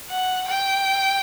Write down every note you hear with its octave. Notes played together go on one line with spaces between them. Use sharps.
F#5
G5